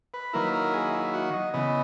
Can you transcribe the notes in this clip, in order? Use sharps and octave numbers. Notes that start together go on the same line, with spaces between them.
B4
D#3 F#3 A#3 E4 A#4
A#4
G#4
E4
F#4
D#5
C#3 E3 B3 D#5